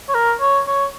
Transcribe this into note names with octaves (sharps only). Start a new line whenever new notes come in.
C#5
A#4
C#5
C#5